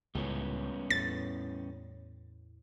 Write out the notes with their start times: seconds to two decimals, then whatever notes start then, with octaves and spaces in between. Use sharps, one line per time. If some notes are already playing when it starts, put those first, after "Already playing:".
0.15 C#2 A2 G3 B3 C#4
0.90 E2 A2 A6